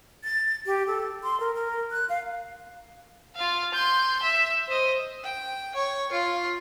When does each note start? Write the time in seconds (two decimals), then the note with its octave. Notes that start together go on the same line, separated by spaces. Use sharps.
0.24 A6
0.66 G4
0.87 A4
1.23 C6
1.40 A#4
1.55 A#4
1.91 F#6
2.09 F5
3.36 F4 F5
3.74 C6 G6
4.22 E5
4.67 C5 D#5
5.24 G5
5.75 C#5
6.12 F4